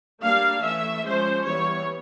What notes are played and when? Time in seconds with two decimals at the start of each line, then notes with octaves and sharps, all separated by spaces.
0.22 G3 A#3 D4 F5
0.63 E3 A3 C#4 E5
1.04 F3 G#3 C#4 C5
1.45 E3 G3 B3 C#5